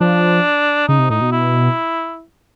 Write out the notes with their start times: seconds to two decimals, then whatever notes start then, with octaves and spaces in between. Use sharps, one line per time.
0.01 F3 D4
0.88 C#3 D#4
0.99 C3
1.10 A2 D#4
1.21 B2
1.32 E4